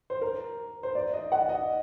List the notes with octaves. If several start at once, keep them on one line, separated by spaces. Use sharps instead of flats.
C5
A#4
C5
D5
D#5
F#5
D#5